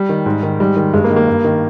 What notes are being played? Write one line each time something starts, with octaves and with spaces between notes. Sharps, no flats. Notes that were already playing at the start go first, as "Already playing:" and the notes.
Already playing: G3
D#3
G#2
D#3
G#2 G3
D#3
G2 G#3
A#3
D#3
A#3
G2
D#3